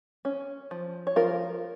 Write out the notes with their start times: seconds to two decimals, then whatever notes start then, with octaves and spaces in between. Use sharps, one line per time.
0.25 C#4
0.71 F3
1.07 C#5
1.16 F3 F4 A#4